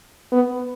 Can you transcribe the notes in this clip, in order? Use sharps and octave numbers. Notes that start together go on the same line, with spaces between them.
B3